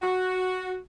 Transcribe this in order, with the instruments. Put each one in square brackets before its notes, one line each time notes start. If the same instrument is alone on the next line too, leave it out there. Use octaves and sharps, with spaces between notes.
[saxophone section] F#4